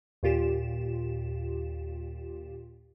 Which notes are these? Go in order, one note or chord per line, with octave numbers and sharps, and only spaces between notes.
D#2 A#2 F4 G4 E7